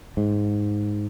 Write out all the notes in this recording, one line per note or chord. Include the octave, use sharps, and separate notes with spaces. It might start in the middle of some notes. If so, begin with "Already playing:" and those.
G#2